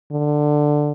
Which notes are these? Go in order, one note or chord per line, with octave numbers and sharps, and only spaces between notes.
D3